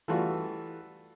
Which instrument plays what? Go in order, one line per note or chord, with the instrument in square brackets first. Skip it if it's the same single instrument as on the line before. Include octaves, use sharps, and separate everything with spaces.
[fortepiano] E3 G3 A3 F4 F#4